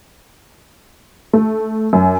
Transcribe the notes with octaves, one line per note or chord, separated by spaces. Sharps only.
A3
F#2